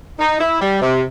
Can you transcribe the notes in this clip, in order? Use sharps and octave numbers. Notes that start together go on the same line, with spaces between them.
D#4
E4
G3
C3